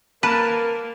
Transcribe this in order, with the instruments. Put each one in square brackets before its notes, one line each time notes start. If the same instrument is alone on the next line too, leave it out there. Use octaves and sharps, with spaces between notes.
[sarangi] A#3 [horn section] A#4 [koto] B4 [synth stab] A5